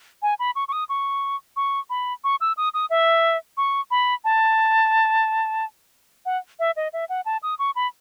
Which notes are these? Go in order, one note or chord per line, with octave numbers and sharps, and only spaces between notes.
G#5
B5
C#6
C#6
D#6
C#6
C#6
B5
C#6
E6
D#6
D#6
E5
C#6
B5
A5
F#5
E5
D#5
E5
F#5
A5
D#6
C#6
B5